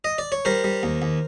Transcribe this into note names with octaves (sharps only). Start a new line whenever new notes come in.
D#5
D5
C#5
G3 A#4 C5
G3
D#2
D#2